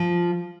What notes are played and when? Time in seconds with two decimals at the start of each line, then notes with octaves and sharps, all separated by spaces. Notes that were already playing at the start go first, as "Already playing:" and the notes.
Already playing: F3